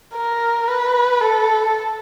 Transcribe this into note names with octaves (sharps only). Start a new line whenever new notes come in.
A#4
B4
A4